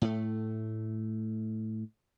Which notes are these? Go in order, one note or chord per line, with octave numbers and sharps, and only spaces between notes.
A2 A3